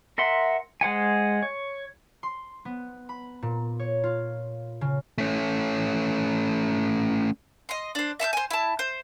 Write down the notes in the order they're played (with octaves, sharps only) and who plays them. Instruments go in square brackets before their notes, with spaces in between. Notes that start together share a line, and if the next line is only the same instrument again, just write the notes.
[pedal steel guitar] A#4 E5 F#5 C6
G#3 C5 F#5 G#5
C#5
[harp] C6
B3
B5
A#2
C#5
F4
C#3
[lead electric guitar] A3 C#4
[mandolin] D#5 C6
D4 C5
E5 A5 C6 G6
C5 G#5
E4 A5
C5